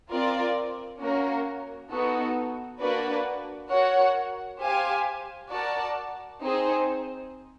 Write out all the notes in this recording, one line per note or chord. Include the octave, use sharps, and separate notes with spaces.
C4 F4 A#4 D5
A#3 C#4 F#4 A#4
B3 D#4 F#4 A4
A#3 D4 F#4 B4 D5
F#4 A#4 C#5 F#5
G4 C5 F5 G#5
F#4 A#4 D5 F#5 A5
C4 D#4 G#4 C5